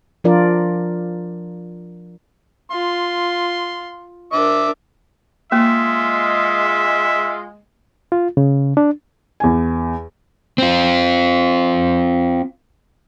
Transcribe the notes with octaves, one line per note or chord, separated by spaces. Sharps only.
F3 D4 F4 A#4 D5
F4 C6
D4 A#4 E5 D6
G#3 A#3 F4 E5
F4
C#3
D4
E2 G#5
C4 F4